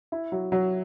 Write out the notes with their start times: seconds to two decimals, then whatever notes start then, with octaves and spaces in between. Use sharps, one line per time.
0.12 E4
0.32 F#3
0.52 F#3